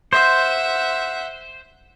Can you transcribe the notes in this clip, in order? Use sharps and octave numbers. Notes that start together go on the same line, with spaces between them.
C5 E5 F#5